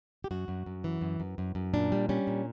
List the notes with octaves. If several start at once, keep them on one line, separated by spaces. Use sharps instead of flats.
G4
F#2 F#4
F#2
F#2
E3
F#2
F#2
F#2
F#2
A#2 D4
G3
G3 C#4
A#2